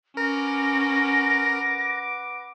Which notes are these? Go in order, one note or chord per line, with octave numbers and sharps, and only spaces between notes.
C#4 A#4 B4 F#5 D6 A#6